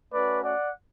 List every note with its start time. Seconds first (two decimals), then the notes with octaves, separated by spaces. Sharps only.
0.12 A3 C#4 F#4 B4 D5
0.42 D5 F#5